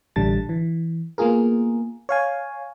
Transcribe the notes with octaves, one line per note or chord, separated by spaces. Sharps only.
A1 D3 G3 A5 A6
E3
A#3 B3 F4 G#4 A#4
C#5 F5 G#5